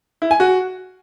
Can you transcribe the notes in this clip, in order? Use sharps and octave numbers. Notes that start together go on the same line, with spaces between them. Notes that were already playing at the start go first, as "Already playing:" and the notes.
E4
G#5
F#4